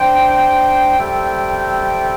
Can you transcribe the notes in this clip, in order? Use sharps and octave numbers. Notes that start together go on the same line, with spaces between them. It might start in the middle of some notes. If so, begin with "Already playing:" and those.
Already playing: D4 C5 G5
G3 C4 A4 E5 G5